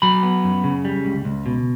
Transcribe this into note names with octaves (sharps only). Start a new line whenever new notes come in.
F#3 B5
B3
F#2
C#3
G3
C#2
C#2
B2